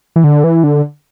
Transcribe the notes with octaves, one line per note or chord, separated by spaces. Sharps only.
E3
D3
E3
D3